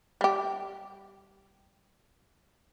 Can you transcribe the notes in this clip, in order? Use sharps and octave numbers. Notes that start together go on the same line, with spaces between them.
G3 G4